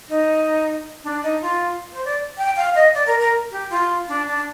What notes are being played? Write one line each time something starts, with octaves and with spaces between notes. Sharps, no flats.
D#4
D4
D#4
F4
C5
D5
G5
F5
D#5
D5
A#4
A#4
G4
F4
D4
D4